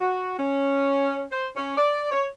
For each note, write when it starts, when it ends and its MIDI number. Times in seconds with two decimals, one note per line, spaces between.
0.01 0.34 66
0.39 1.24 61
1.32 1.47 72
1.56 1.77 61
1.77 2.10 74
2.11 2.26 73